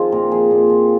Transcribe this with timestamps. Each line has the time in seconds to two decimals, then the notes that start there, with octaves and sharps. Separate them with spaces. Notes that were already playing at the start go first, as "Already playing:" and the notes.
Already playing: D#3 F3 C4 F4 G#4
0.12 A#2 A#4
0.31 F3 G#4
0.51 A#2
0.70 F3